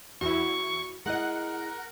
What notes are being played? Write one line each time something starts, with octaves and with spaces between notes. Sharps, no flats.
E2 E4 F#4 C#6
G#3 E4 A#4 D#5 F#5 F#6